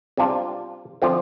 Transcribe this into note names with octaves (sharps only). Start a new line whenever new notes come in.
C3 G3 D4 F4
D3 F3 C4 F4